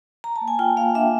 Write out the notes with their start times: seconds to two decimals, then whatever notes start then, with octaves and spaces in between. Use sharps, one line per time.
0.24 A#5
0.36 A5
0.41 A#3
0.48 G#5
0.59 F4 G5
0.77 A#3 F5
0.95 D4 E5